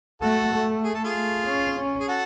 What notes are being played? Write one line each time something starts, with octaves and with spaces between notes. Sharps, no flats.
A3 F#4 A4
A3
G#4
A4
F4 G#4
A3
C#4
C#4
G#4
F#4 A4